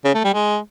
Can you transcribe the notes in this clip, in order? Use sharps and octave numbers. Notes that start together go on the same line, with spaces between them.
C#3
A3
G3
G#3